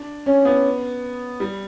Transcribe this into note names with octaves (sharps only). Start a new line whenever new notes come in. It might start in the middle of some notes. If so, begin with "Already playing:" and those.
Already playing: D4
C#4
B3
G3